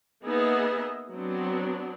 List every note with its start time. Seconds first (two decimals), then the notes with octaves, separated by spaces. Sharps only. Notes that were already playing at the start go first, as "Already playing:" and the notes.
0.23 A#3 B3 D#4 G#4 D#5 E5
1.12 F#3 B3 C4 D4